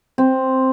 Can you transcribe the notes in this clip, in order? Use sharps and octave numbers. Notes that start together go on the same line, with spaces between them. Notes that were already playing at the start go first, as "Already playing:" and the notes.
C4